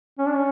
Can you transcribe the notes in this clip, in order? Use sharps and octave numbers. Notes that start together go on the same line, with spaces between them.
C#4
D4
C#4